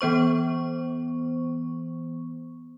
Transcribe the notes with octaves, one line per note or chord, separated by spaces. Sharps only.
E3 B3 C5 C#6